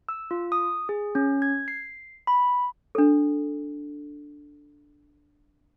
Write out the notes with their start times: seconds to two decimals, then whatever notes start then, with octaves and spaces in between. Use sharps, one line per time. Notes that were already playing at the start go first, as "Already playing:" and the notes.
0.09 E6
0.31 F4
0.52 D#6
0.89 G#4
1.15 C#4
1.42 G#6
1.68 C7
2.27 B5
2.95 D4 A4